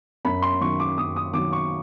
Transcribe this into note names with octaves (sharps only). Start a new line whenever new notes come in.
F#2 B5
C6
D#3 F#3 C#6
D6
F#2 D#6
D#6
D#3 F#3 D6
C#6